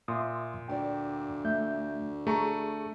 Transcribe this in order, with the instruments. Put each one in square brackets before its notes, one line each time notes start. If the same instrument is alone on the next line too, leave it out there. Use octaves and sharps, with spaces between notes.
[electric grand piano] A#2 [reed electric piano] E5 C6 D#6
[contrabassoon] D2 [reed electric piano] D5 G5
[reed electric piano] A3 E5 G6
[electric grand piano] A3 A#5 C#6 [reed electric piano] G#4